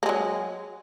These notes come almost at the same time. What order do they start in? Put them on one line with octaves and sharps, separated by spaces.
A#3 G#3 F#3